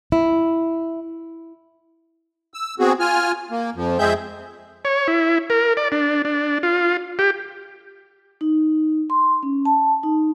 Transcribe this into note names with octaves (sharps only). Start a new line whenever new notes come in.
E4
E6
B3 C4 F#4 G#4
F4 G#5 F6
A#3
F2 F3
F2 G#3 C4 G#4 E5 G6
C#5
E4
A#4
D5
D4
D4
F4
G4
D#4
C6
C#4
A5
D#4